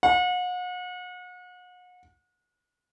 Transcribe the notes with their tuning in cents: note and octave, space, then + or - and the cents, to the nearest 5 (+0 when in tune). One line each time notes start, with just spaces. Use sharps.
F#5 -40